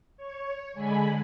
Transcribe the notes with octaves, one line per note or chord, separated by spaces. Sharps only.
C#5
D3 G#3 G#5 B5